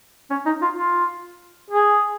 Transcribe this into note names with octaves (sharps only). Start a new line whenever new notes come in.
C#4
D#4
F4
F4
G#4